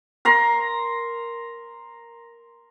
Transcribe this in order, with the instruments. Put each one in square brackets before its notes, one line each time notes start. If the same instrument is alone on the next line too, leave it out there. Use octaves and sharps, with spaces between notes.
[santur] A#4 A#5 C6